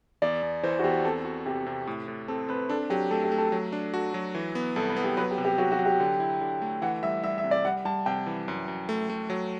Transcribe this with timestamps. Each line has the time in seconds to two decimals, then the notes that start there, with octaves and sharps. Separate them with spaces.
0.22 E2 D5
0.43 E2
0.63 E3 C5
0.79 F#4
0.84 E2 G4
1.04 C4 A4
1.25 F#4
1.46 C3 G4
1.66 C3
1.87 A2
2.08 A2
2.28 C4 A4
2.49 C4 B4
2.69 D4 A4
2.90 F#3 G4
3.11 A3 A4
3.24 G4
3.32 A3
3.38 A4
3.52 F#3
3.72 D4
3.94 F#4 A4
4.14 F#3
4.35 E3
4.55 B3
4.76 C2 A4
4.90 B4
4.96 B3
5.04 G4
5.17 F#3 B4
5.31 G4
5.38 C3
5.45 G4
5.58 F#3 F#4
5.72 F#4
5.79 F#3
5.86 G4
6.00 D3
6.20 E4
6.41 D3
6.62 A3
6.82 E3 F#5
7.03 G3 E5
7.23 G3 E5
7.38 E5
7.44 C3
7.51 D5
7.65 G3 F#5
7.85 G3 A5
8.06 C3 G5
8.26 E3
8.48 F#2
8.68 F#2
8.89 A3
9.10 A3
9.30 F#3